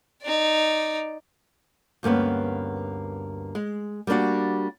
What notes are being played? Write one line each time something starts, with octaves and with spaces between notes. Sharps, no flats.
D#4 D5
D2 G2 A#3 B3 C#4
G#3
G3 A#3 B3 D4 F#4